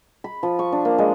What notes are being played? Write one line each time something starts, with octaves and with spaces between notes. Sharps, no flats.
B5
F3
C#6
D4
A#3
G#3